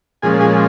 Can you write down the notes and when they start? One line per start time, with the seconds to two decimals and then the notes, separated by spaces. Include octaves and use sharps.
0.22 A#2 F3 G#3 C#4 G#4 G#5
0.40 G#4 G#5